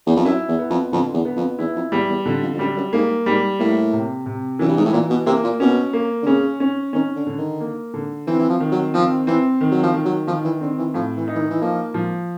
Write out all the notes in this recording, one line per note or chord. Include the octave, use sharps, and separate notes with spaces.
E2
F2
F#2 E4
E2
B3
F2
F2 D3
E2
B3
F2
E2 E4
F2
E2 G3
E2
F2 D3
F2
F2
F#2 G3
F#2
G#2 A#3
G#2 G3
A2 A#3
C3
C3
F#2 E3
G2
G#2
A2
A#2 E3
B2
C3 A#3
A#2
B2 C#4
A#3
D3
C#3 C#4
C#4
D#3 C#4
D3
D3
D#3
A#3
D3
E3 C4
E3
F3
D#3
F#3
F3 C4
E3 C4
D#3
F#3
F3
D#3
F#3
D#3 F3
E3
D3 C4
E3
A2 F3
E3
D#4
E3
D#3
E3
F3 A#3
F3